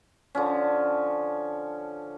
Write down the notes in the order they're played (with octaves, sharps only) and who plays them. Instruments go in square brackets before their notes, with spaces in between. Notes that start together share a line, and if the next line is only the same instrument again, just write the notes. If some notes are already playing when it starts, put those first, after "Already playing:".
[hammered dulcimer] D3 F3 C#4